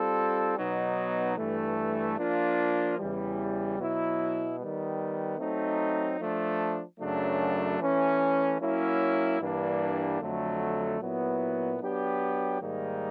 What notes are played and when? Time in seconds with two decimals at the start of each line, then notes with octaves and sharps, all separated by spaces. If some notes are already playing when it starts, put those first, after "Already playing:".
Already playing: G3 C4 F4 A4
0.58 B2 F#3 B3 D#4
1.37 G2 E3 A3
2.18 F3 A#3 D4 F4
2.98 E2 C#3 E3 G3
3.79 B2 F#3 B3 E4
4.59 D#3 G3 B3
5.39 F#3 A3 C4 D#4
6.19 F3 A3 D4
7.00 F#2 C#3 F#3 A3 D4
7.79 E3 A3 C#4
8.60 F#3 A#3 C#4 E4
9.40 G2 E3 G3 A#3 D4
10.21 F2 D3 F#3 A3
11.01 A#2 F#3 B3 E4
11.81 F#3 B3 D4 G4
12.61 G#2 D#3 G3 A#3 D#4